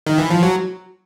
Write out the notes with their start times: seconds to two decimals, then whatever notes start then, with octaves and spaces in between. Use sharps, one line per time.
0.06 D#3
0.18 E3
0.30 F3
0.43 F#3